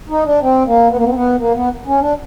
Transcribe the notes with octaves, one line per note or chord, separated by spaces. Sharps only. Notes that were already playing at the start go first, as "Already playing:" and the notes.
D#4
D4
C4
A#3
B3
A#3
B3
C4
B3
A#3
B3
C#4
D4